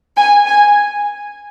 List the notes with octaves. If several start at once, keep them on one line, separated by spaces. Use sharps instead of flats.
G#5
G#5